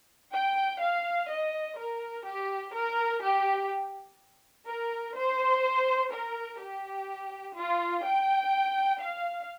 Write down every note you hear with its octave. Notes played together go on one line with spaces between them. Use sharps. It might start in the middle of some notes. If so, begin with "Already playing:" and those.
G5
F5
D#5
A#4
G4
A#4
G4
A#4
C5
A#4
G4
F4
G5
F5